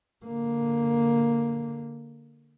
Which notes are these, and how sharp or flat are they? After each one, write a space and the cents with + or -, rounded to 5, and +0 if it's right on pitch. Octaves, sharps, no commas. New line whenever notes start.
D3 -10 A#3 +0